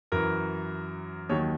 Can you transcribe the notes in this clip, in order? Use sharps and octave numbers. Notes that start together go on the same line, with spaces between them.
F#2 E3 A#4
D#2 D#3 F#3 C#5